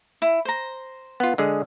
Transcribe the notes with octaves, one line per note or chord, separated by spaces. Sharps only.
E4
C5 A#5
B3 F4
D3 G#3 G#4